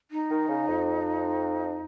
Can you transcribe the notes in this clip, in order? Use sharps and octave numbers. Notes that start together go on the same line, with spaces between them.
D#4
D#3
C#3
F2